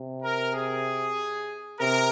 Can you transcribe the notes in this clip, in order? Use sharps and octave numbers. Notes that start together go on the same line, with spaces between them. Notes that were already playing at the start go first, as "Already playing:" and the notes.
Already playing: C3
A#4
G#4
C3 A#4